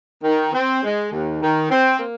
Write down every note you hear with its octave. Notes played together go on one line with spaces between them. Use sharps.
D#3
C4
G#3
D#2
D#3
C4
A#3